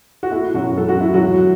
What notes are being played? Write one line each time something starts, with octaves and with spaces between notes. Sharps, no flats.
F#4
A3 E4
F#2 F#3 F#4
F#2 A4
F#4
A3 E4
F#3 F#4
D2